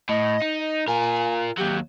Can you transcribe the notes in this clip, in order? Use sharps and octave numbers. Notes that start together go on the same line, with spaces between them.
A2 D#5
D#4
F4 A#4 G#5
D#2 F#3 G4